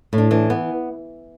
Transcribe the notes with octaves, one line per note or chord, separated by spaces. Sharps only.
A2
D4
E3 D4
B3